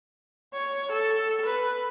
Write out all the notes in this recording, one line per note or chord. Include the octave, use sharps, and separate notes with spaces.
C#5
A4
B4